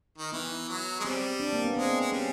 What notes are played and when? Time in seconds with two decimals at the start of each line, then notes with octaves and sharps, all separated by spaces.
0.18 D#3
0.32 E3 B3
0.68 F#3
1.00 G#3
1.04 G3 C4
1.40 D4
1.53 A#3
1.64 B3
1.76 G#3 C4
2.01 G#3
2.12 G3 C#4